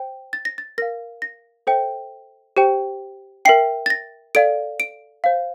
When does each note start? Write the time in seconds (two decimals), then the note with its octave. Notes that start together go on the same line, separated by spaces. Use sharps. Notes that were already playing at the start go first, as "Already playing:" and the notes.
Already playing: C5 G5
0.33 A6
0.45 A#6
0.58 A6
0.78 A#4 F5 A#6
1.22 A#6
1.67 A4 C5 E5 G5
2.57 G4 C5 G5
3.45 A#4 E5 G5 C7
3.86 A6
3.90 A#6
4.35 A4 D5 F5 D7
4.80 D7
5.24 C5 F5